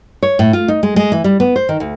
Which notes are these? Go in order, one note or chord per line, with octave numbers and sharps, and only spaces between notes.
C#5
A2
F4
D#4
G#3
G#3
E3
G3
B3
C5
D#3
D2